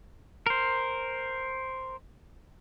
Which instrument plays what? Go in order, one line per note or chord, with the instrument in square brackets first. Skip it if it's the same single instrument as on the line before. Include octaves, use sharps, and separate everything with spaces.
[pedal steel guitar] A#4 C5